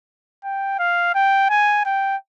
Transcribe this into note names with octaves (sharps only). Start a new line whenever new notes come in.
G5
F5
G5
G#5
G5